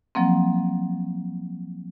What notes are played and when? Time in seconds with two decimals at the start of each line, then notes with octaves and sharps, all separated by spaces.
0.15 F3 F#3 A#3 C4